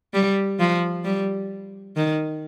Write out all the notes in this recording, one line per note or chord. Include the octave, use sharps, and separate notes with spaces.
G3
F3
G3
D#3